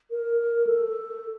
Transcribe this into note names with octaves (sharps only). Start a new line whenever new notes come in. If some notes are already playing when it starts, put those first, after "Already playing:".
A#4
A4